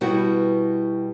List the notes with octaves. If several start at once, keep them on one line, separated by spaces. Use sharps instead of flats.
B2 G3 B3 E4 F#4